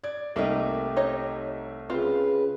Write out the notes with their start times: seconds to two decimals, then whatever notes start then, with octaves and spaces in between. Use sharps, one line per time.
0.04 D5 G#6
0.36 C2 A3 A#3 D#4 G4 E5
0.97 D#4 C#5 D#5
1.90 C#3 C4 F4 B4